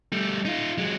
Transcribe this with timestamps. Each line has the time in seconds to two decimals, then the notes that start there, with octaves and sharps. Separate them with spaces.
0.12 G3 A3
0.45 D#4 F4
0.78 F#3 G#3